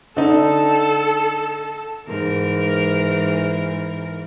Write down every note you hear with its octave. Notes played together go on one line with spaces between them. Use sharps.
D3 D#4 A4 A5
G#2 E3 A#4